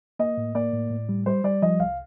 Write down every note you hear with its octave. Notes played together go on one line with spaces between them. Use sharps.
A#3 D#5
A2
A#3 D5
A2
A2
G3
G3 C5
G3 D5
F3 D#5
C2 F5